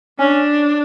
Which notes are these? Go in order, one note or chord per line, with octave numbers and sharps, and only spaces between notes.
C#4 D4